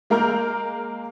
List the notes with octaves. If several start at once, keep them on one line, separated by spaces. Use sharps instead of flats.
G#3 A#3 A#4 A#5 F6 G6